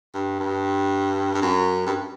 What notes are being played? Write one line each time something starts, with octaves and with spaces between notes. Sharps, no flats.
G2
G2
G2
F#2
G2